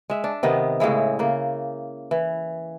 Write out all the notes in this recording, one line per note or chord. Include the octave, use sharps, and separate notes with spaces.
G#3 E5
D4
C3 D#3 B3 D#5
A2 C#3 G#3 E4
C#3 A#3
E3